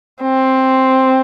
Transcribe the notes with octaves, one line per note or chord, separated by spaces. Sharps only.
C4